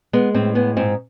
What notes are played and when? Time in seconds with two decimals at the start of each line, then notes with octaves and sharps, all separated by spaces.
0.13 G#3 B3
0.34 A2 C4
0.55 G#3 B3
0.77 G#2 C4